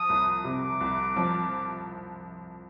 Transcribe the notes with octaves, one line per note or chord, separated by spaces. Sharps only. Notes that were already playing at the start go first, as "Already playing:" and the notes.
Already playing: F3 D#6
C2
C3 D6
C2
F3